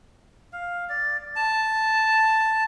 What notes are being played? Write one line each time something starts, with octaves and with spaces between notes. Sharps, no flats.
F5
D5
A5